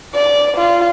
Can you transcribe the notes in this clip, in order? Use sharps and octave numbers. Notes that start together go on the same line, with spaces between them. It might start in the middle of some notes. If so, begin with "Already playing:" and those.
D5
F4